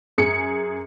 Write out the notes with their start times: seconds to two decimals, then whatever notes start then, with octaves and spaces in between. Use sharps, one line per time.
0.18 F#2 G#4 C#7